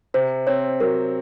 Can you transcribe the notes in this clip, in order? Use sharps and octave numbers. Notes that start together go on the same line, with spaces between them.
C3 C5
C4 C#5
F#3 A#4